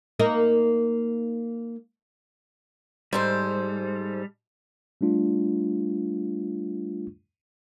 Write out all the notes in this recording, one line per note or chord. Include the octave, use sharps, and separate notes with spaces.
A#3 D#4 A#4
G#2 G3 A4 C5
G3 A3 D4 F4